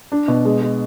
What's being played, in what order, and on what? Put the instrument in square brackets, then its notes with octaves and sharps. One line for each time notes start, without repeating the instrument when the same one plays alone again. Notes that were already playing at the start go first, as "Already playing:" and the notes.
[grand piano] D4
B2
G#3
G#3